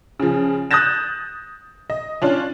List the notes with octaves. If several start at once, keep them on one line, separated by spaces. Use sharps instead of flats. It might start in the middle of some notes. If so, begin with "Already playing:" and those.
C#3 F3
D#6 F#6 G6 A6 A#6 E7
D#5
C#4 D4 F4